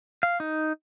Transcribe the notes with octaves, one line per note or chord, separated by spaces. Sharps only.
F5
D#4